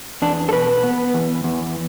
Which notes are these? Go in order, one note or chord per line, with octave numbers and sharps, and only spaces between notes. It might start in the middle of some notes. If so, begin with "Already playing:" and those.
E2 D4
A4
B2 B4
B3
E2
E2